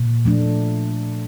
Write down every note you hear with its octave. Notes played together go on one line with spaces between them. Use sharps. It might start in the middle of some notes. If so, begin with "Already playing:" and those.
Already playing: A#2
F3 A3 D4